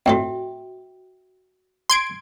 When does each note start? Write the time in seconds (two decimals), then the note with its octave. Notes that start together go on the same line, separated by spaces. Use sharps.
0.06 F2 A2 F#4 A4 E5 G5
1.90 C6 G#6 D7